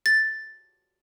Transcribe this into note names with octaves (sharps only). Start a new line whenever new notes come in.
A6